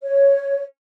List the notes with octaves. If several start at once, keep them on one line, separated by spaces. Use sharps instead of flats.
C#5